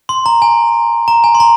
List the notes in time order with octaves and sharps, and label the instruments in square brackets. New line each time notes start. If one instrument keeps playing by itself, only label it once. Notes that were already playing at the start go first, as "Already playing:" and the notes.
[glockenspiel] C6
A#5
G#5
A#5
G#5
C6
A#5